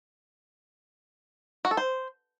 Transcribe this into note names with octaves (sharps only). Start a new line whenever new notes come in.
F#4
A4
C5